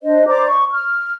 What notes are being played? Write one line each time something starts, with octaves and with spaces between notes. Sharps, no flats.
D4 C5 D#5
C5 D5 A#5 D6
C#6
F6